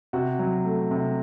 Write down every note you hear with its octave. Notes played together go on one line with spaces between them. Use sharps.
C3 F#4
F#3
A3
C3